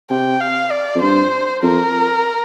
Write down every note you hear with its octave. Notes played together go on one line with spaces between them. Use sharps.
C3 G5
F5
D5
F2
G2 C5
F2 A#4